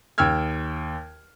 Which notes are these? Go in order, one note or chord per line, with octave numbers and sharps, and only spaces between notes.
D#2 G5 E6 F6 G#6